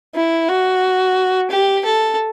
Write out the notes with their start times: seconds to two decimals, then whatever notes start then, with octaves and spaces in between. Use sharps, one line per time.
0.15 E4
0.49 F#4
1.51 G4
1.85 A4